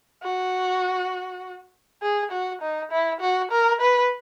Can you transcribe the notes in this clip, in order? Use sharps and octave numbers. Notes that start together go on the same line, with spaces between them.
F#4
G#4
F#4
D#4
E4
F#4
A#4
B4